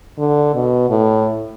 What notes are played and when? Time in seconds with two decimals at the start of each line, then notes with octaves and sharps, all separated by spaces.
0.18 D3
0.54 B2
0.90 A2